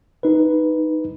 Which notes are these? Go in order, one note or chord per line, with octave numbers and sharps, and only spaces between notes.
D#4 B4